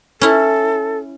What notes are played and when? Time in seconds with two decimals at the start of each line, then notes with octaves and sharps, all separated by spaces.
0.21 C#4 E4 A4